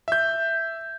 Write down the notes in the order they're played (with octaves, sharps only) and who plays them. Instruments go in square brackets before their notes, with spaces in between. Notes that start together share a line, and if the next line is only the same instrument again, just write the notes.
[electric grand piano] E5 G6